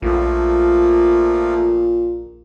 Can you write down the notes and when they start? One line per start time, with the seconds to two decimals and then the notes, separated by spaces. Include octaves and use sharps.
0.02 A#1 A#2 F3 A3 A#3